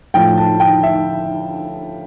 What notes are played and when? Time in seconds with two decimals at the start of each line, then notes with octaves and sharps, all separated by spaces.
0.14 A2 F3 G5
0.38 A5
0.60 G5
0.83 E5